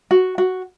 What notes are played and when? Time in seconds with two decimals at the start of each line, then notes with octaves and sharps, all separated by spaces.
0.11 F#4
0.38 F#4